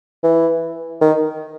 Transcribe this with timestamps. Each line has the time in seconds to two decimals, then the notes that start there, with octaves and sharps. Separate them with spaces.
0.24 E3
1.01 D#3